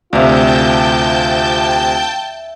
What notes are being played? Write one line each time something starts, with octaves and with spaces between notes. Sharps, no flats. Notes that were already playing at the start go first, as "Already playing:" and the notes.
D2 C3 F4 E5 F5 G5 A5 G6